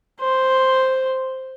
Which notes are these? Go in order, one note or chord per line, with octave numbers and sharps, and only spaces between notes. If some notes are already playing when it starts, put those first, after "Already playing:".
C5